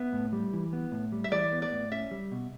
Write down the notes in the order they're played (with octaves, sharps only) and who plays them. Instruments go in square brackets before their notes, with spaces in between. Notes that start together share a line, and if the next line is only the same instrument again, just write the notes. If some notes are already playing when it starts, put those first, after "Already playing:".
Already playing: [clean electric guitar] B3 [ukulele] E5
[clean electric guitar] A2
G3
E3
B3
A2
G3
[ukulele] E5
[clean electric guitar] E3 [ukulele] D5
[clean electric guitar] B3
[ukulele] D5
[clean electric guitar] A2
[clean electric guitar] C#4 [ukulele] E5
[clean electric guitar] G3
B2